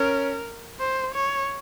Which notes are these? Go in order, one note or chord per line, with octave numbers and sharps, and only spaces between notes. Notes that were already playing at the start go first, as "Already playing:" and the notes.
Already playing: C#4 A#4
C5
C#5